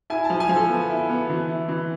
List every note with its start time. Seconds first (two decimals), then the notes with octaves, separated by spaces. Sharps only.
0.10 E4 G#5
0.24 A5
0.30 F3
0.40 G#5
0.49 F3
0.55 A4
0.69 B3
0.89 E4
1.09 B3
1.29 E3
1.49 E4
1.68 E3